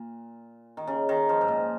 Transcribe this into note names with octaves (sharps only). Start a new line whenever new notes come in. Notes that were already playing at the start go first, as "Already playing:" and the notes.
Already playing: A#2
D#3
C#3
D#3
F3
G#2
A#2